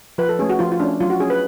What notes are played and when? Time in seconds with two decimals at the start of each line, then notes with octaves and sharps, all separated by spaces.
0.18 F3 B4
0.29 A4
0.39 A3 C#4 G#4
0.49 F#4
0.59 F3 F4
0.72 F4
0.80 A3 C#4 D4
1.00 F#3 F4
1.10 F#4
1.20 C#4 G#4
1.30 B4